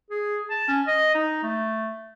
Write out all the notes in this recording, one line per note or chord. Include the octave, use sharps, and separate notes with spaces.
G#4
A5
C#4
D#5
D#4
A3